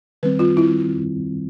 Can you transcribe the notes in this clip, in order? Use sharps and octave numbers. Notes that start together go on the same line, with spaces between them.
D#3 G3 C4 B4
F4
E4